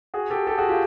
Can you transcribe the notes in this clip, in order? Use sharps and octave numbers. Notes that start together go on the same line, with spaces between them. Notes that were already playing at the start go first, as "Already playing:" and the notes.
F#4 G#4
G4 A4
G4 A4
F#4 G#4
F4 G4